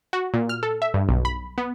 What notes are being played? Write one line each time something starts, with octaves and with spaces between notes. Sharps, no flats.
F#4
A#2
F6
A4
E5
G2
B1
B5
B3